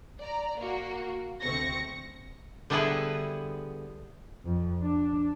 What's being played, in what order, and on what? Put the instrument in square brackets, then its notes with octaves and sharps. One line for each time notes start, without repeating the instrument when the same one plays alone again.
[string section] D5 A#5
A#3 F#4
D2 A3 C4 C#6 A#6 C#7
[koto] D3 G3 B3 E4 G#4 B4
[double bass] F2
D4